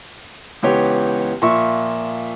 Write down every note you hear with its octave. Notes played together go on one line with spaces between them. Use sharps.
C#2 E3 B3 G4 C#5
A#2 F3 E5 C#6